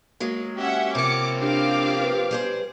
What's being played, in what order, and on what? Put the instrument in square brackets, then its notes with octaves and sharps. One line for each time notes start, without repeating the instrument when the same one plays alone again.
[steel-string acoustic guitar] F#3 G#3 A#3
[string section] C#4 E5 F#5 [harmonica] G4
[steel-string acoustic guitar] C3 C#4 [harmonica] F3 A#3 C4 [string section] D6 C#7
[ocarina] D4 [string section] G4 F5 D6
[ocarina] B4
[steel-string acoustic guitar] G3 G#4 C5